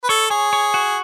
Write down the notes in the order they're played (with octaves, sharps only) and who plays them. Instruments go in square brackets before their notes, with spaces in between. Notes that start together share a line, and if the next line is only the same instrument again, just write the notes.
[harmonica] B4
[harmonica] A4 [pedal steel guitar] C#5
[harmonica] G#4 [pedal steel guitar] C#5
[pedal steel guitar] C#5
F#4